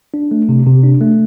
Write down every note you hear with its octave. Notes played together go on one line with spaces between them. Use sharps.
D4
A3
C3
C3
D4
A3